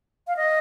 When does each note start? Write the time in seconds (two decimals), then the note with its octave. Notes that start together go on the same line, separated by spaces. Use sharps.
0.27 F5
0.36 D#5